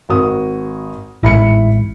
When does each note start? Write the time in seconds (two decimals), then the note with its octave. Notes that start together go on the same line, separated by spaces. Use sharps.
0.09 G#1 F#4 D#6
1.23 A1 G#2 E4 B5 C#7